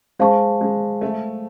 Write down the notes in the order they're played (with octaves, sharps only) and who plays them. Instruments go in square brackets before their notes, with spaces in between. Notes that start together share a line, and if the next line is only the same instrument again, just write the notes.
[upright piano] G#3 [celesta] C5 F5 A5 C#6
[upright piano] G#3
A3